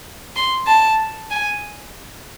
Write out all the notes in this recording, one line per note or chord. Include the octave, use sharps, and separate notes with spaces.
C6
A5
G#5